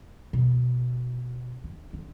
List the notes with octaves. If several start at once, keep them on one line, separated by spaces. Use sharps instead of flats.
B2
D3
D3